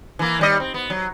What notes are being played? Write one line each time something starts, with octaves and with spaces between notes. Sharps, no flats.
E3 A#3
D#2 G3 D#5
C4
B3
F#3